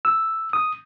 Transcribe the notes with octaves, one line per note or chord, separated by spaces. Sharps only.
E6
D#6